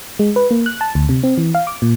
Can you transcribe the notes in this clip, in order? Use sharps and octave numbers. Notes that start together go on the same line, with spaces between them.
G#3
B4
A#3
F#6
A5
D2
C3
C4
E3
F5
D6
A#2